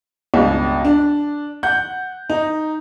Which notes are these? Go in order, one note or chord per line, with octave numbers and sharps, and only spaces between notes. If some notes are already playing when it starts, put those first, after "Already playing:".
C#2 G2 B2
D4
F#5 G6
D#4